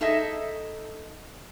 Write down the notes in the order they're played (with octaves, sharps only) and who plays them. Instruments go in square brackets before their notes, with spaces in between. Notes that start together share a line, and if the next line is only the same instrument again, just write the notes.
[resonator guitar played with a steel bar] D#4 G#4 A4 D#5 E5